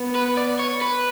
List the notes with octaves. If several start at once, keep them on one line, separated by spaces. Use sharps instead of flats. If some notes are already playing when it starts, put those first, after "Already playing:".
Already playing: B3
B4
D5
C#5
B4